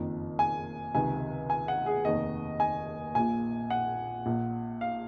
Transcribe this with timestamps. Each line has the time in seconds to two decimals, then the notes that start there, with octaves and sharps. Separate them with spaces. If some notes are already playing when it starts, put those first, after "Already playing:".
Already playing: F#1 F2 D#3
0.39 G#5
0.94 C#2 C3 D#3 G#5
1.50 G#5
1.68 F#5
1.86 G#4
2.05 F1 D#2 D#3 D#5
2.60 G#5
3.15 A#1 A#2 G#5
3.70 F#5
4.26 A#1 A#2
4.81 F5